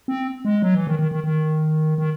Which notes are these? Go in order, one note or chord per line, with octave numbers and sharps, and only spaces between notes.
C4
G#3
F#3
E3
D#3
D#3
D#3
D#3
D#3